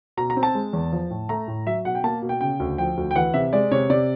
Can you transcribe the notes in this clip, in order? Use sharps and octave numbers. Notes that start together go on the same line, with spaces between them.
B2 A#5
A#5
C4
A5
G#3
E2
F3
A2
A3 A#5
A2
F#3 E5
B2 F#5
G5
A#3 A5
B2
G5
C#3 G5
D2
F3 G5
D2
G5
E3 F#5
C3 E5
G#3 D5
C3 C#5
C3 D5